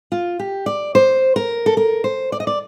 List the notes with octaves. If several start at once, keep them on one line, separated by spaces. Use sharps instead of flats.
F4
G4
D5
C5
A#4
A4
A#4
C5
D5
D#5
D5